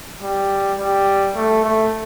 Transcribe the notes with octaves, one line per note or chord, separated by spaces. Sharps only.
G3
G3
A3
A3